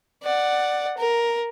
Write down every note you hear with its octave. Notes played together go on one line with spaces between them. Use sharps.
D5 F#5
A#4